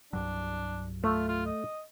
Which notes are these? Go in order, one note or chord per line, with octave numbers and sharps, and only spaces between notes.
C2 G2 F#3 D4
A3 F4
F4
D#5